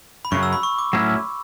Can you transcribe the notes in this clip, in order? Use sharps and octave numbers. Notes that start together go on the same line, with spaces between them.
B5
F#2 C#3 F#3 C#6
E6
B5
C#6
D6
A2 F#3 C#4 E4